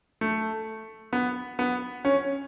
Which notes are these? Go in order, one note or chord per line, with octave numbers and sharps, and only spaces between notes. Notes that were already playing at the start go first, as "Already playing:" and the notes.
A3
B3
B3
C#4